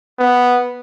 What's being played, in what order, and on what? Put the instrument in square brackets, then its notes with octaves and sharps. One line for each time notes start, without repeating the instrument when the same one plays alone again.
[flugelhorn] B3